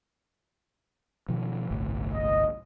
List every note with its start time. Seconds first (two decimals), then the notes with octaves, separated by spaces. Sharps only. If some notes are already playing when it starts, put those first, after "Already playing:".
1.29 B2 D#3 F3
1.71 G1 C2 A2
2.13 D#5